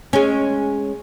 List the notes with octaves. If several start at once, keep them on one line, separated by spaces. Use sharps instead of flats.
G#3 C#4